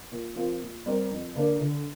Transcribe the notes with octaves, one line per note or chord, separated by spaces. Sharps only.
A#2
F3 C4 F4 A#4
A#2
G3 C4 A#4 D5
F2
D3 A#3 D4
D3